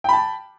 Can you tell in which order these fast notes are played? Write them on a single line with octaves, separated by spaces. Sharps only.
G5 B5 A5